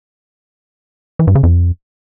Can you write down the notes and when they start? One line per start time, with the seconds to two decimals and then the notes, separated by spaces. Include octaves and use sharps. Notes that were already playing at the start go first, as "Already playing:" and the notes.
1.19 E3
1.27 G2
1.35 C#3
1.43 F2